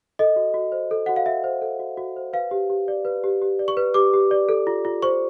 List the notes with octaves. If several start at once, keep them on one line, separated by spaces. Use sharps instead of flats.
A4 D#5
F#4
F#4
C5
A4
F#4 F#5
F5
F#4 E5
C5
A4
F#4
F#4
C5
B4 F5
G4
G4
D5
B4
G4
G4
D5
C#6
B4
G4 D6
G4
D5
A4
F4
F4
C5 C#6